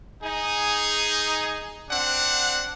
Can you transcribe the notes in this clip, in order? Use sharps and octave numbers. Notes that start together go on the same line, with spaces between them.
D#4 G#4
C4 D4 F#5